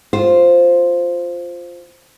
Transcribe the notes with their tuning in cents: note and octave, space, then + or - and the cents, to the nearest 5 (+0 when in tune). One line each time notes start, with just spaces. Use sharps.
F4 +0 C5 +0